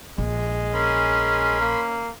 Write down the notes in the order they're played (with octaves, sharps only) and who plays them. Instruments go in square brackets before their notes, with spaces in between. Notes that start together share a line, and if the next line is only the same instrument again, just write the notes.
[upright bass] A#1 [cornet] G#3
[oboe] C#4 [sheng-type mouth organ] A#4 B5 C6
[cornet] A#3